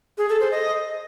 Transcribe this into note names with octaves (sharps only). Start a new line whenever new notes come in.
G#4
A4
C5
D#5